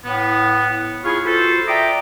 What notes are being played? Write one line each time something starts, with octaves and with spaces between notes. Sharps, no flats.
A2 B3
E4 F4 G#4 F5 G#5 C#6
F4 F#4 A4 B4 C5
D5 E5 G5 A#5 D6 D#6